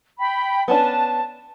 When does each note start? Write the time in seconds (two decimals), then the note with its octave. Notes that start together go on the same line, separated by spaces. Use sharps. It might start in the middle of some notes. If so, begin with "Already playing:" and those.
0.19 G5 B5
0.68 B3 C#4 D4 A5